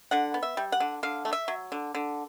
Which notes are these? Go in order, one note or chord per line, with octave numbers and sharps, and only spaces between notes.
D3 F#5
B3
E5
G3
F#5
D3
D3 F5
A3
E5
F#3
D3
D3